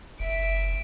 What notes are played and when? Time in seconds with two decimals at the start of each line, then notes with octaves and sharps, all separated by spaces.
0.20 F#1 E5 D7